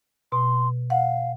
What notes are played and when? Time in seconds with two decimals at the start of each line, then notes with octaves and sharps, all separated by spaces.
0.32 B2 C6
0.90 F5 F#5